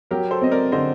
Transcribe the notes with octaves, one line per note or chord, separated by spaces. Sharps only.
F#3 G4 A#4
A4 C5
C4 D#5
A#4 D5
D3 C5 D#5